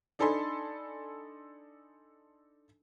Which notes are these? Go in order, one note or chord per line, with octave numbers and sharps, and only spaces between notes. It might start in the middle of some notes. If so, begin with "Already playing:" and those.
D4 D#4 A4 G#5 B5 C6